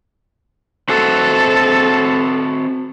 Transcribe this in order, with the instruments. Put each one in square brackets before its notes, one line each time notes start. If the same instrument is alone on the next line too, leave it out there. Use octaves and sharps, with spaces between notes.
[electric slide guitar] C4 F#4 E5 [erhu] A4